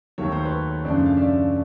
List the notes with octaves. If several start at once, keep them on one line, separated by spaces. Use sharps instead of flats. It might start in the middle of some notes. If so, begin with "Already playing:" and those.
D#2 D#3 F#3 A3 C#5
C5
B4 C#5
F#2 C#3 F3 A3 D4 C5 D5
F5
D5 E5